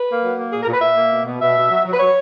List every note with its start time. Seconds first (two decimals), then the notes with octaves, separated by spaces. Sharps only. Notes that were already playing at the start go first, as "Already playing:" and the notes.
Already playing: B4
0.09 A#3
0.23 F#3
0.38 A#3
0.52 A#2 G#4
0.63 A#4
0.67 A#2
0.72 B4
0.81 A#2 E5
0.96 A#3
1.11 B2
1.25 B2
1.41 B2 E5
1.56 B2
1.70 F#3
1.85 F#3
1.93 B4
1.99 F#3 C#5